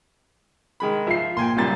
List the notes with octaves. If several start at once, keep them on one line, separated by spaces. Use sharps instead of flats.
D#3 G#3 B5
F3 F4 E5 C7
A#2 G5 G#5 C6
C#2 F#2 A#2 G3 A6